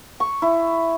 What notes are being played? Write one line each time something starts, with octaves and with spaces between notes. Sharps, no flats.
C#6
E4